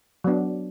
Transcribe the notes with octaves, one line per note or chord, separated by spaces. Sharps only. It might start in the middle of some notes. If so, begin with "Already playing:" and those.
F#3 B3 D4